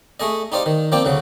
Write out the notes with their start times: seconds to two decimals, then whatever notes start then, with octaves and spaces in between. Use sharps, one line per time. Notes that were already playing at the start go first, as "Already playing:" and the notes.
0.20 A3 G#4 D#5
0.52 D#4 G4 C5 D5 F5
0.66 D#3
0.92 F3 A#3 C4 D5 G5
1.05 D2 C#3 F#3